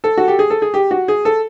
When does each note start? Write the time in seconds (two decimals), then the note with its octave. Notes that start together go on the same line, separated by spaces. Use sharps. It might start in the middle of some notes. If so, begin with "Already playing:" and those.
0.04 A4
0.17 F#4
0.28 G4
0.39 G#4
0.50 A4
0.62 G#4
0.74 G4
0.91 F#4
1.08 G#4
1.25 A4